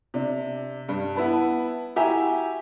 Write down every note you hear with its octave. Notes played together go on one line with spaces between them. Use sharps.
C3 D4
G2
B3 E4 B4 A5
E4 F#4 G4 E5 G#5 A#5